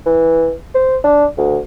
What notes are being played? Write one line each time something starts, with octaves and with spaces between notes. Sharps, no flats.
E3
C5
D4
D2